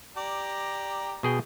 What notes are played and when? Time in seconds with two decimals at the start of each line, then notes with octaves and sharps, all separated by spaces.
0.17 G4 D5 A#5
1.23 B2 G#4 G5